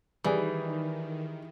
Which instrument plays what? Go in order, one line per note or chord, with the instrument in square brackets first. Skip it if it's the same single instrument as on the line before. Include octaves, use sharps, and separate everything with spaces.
[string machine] D#3 [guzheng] E3 [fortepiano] G3 G#4